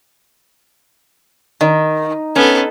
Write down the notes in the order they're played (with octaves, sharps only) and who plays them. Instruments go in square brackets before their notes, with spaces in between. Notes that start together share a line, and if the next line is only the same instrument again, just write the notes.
[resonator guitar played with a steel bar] D#3 [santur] D#4
[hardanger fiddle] B3 A4 [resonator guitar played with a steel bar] C#4